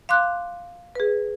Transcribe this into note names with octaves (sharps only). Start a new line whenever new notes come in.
F5 C6 D6 F#6
G#4 B4